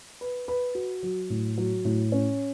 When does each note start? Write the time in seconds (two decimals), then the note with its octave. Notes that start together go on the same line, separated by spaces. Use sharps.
0.21 B4
0.48 B4
0.75 F#4
1.03 F#3
1.30 A2
1.57 F#3
1.85 A2
2.12 C#4